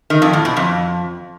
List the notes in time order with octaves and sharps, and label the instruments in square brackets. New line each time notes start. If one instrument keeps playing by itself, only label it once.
[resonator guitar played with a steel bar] D#3
F2
A2
B2
F2